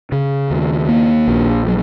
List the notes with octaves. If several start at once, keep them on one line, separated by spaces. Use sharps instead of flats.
C#3
D#2
A#3
A#1
F#3